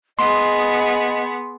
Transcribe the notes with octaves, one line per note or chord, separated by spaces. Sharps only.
B3 G#4 D#5 C6